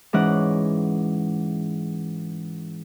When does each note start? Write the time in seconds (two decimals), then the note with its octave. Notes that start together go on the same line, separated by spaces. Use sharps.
0.13 G#2 E3 C#4 D5 F#5 F#6